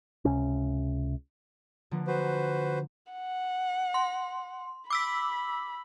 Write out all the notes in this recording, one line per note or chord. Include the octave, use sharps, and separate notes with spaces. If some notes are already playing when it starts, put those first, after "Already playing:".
C#2 C3 C#4
D3 F3 A#3
F#4 B4 C5
F#5
C6
B5 D6 E6 B6